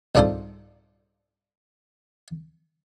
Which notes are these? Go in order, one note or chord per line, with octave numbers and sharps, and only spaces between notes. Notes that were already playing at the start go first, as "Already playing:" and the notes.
C2 G#2 D4 F4 A4 C5